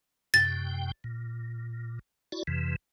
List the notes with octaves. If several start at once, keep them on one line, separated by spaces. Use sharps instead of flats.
F#2 C3 G5 A6
A#2
E4 F#4 D5
F2 C3 E3